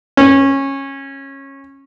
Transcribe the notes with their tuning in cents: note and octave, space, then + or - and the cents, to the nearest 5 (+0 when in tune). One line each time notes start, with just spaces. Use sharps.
C#4 -20